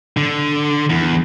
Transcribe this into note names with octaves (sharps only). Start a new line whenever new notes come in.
D3
E2